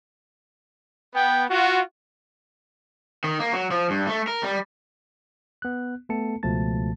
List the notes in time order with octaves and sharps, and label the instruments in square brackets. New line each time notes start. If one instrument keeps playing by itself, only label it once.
[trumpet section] B3 G5
F4 F#4
[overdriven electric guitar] D#3
A#3
F#3
F3
G2
A3
A#4
G3
[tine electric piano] B3 F#6
A3 B3 A4 A5 C#7
C#2 B2 F3 A3 A5 A6